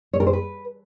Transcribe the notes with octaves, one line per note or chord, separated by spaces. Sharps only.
C#5
A#4
C5
B4